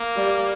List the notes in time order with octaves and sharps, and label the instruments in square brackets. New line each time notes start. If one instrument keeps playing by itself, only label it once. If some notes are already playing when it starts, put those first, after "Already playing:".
Already playing: [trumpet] A#3
[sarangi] G3